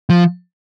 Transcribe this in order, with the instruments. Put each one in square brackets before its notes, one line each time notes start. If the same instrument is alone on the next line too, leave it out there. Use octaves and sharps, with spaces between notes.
[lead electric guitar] F3